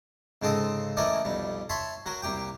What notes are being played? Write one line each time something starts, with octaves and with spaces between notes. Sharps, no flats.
G#2 C#3 C4 A4 D#5
E3 A3 C#4 A#4 D5 D#5
B1 F2 G3
C#5 E5 A5 B5 C6
F#3 F#4 A#4
C2 A#3 G4 G5